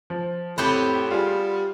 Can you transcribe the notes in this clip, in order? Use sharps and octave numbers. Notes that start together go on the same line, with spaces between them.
F3
F2 A2 B3 C4 G4
G3 F4 G#4